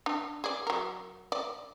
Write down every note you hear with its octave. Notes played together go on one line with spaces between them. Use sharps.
D4
G#4 D5
F#3 A#4
D5